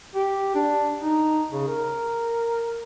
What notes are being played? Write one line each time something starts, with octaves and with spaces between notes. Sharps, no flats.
G4
D4
D#4
C#3
A#4